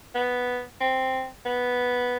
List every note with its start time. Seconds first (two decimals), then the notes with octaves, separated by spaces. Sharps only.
0.15 B3
0.81 C4
1.45 B3